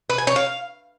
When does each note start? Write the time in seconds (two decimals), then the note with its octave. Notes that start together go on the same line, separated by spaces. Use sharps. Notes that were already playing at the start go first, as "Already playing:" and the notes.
0.10 B4
0.18 G#5
0.27 C#5
0.36 F5